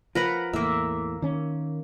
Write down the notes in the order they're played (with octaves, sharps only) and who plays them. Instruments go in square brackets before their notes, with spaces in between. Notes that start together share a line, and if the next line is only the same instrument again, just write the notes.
[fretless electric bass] F3 [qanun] A#4 B4 F#5
[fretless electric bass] E2 A2 [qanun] A#3 E5
[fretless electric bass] D#3 C#4